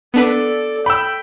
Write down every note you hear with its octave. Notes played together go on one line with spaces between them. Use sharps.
B3 D4 A4 B4 D5
G5 B5 E6